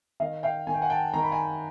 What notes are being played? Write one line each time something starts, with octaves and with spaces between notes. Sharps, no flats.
D#3 D#5 F5
F5 G5
D#3 G#5
G5
F#5 G#5
G5 A5
D#3 A#5
B5
G#5 A#5